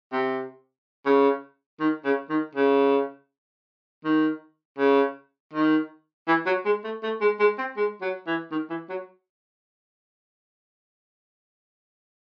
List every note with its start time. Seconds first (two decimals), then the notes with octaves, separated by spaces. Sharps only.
0.12 C3
1.06 C#3
1.80 D#3
2.05 C#3
2.30 D#3
2.55 C#3
4.05 D#3
4.78 C#3
5.53 D#3
6.28 E3
6.46 F#3
6.65 G#3
6.84 A3
7.03 A3
7.21 G#3
7.40 G#3
7.58 C4
7.76 G#3
8.01 F#3
8.27 E3
8.51 D#3
8.70 E3
8.89 F#3